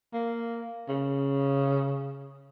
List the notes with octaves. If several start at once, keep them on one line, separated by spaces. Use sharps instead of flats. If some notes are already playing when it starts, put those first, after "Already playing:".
A#3
C#3